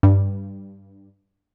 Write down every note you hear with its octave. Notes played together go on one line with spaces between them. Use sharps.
G2